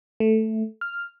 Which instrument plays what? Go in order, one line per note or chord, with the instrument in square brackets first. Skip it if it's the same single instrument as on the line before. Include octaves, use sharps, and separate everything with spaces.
[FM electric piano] A3
F6